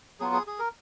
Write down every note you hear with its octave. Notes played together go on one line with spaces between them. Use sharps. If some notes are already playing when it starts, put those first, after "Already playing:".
F#3 B3 F4 G#4
G#4
G#4
A#4